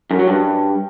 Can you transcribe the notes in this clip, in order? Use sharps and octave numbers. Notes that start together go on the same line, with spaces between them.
F#2
F#3
G2